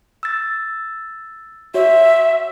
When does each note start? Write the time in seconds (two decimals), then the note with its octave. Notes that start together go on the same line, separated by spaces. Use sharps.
0.23 E6 A6
1.74 F#4 C#5 E5